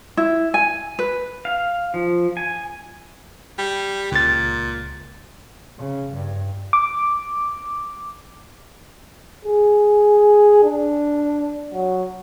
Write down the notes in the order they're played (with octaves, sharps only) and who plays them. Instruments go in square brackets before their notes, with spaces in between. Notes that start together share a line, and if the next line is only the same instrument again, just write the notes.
[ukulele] E4
G#5
B4
[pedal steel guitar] F5
F3
G#5
[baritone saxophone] G3
[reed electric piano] C#2 A6 [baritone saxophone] A#2
[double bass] C#3
G2
[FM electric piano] D6
[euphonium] G#4
D4
F#3